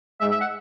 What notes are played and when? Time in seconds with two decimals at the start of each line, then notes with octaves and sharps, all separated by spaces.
0.21 G#2 G#3 E5
0.31 E5
0.41 F#5